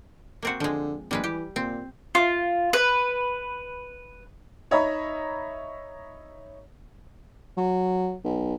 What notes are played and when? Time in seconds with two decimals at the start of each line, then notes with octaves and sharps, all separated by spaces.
0.43 A#3 C4 F#4
0.60 D3 F3 G#3
1.11 A#1 G3 G#3 B4
1.24 E3 G4
1.56 A#2 C4
2.15 F4
2.73 B4
4.71 D#4 C#5 D#5 E5 A#5 B5
7.57 F#3
8.24 B1